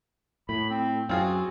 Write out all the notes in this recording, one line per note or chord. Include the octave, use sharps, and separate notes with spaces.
A2 B5
C4
F#2 C4 F4 F#4 G#4